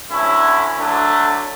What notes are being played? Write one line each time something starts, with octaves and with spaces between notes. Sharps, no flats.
D2 D3 F#3 C#4 E4
D3 F#3 A3 D4